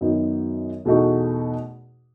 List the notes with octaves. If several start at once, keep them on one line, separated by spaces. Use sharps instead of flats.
F#2 D#3 F#3 B3 D#4
E2 B2 A3 D#4 F#4